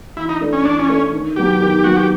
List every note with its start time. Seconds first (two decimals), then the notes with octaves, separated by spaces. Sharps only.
0.16 E3 E4
0.29 D#4
0.40 A3 D4
0.53 C#4
0.65 E3 D4
0.79 C#4
0.89 A3 D4
1.12 D#3
1.36 F#3 B3 G4
1.60 D#3
1.84 F#3 B3 F#4
1.96 G4